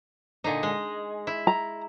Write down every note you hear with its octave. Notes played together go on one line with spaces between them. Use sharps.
A#2 D3 D#4
G#3
E4
A#5